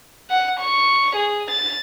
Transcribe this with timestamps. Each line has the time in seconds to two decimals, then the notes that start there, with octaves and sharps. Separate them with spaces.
0.30 F#5
0.60 C#6
1.16 G#4
1.51 A6